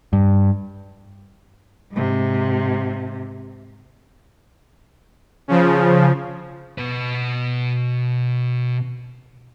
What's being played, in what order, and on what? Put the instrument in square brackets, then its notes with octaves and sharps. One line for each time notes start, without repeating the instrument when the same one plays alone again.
[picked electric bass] G2
[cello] G#2 C3
[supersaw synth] C#3 F3
[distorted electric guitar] B2 B4